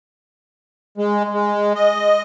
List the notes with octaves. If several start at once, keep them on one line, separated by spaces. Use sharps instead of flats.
G#3
G#3
D#5